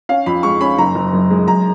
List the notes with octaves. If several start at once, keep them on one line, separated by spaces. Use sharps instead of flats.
C#4 F5
F2 B5
G#3 C#6
C#4 B5
F#1 A#5
F#1
F#2
G#3
F#2 A#5